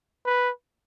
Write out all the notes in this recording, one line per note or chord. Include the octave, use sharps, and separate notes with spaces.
B4